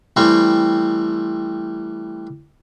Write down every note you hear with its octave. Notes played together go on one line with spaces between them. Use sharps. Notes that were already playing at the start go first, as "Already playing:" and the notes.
E3 G3 A3 C4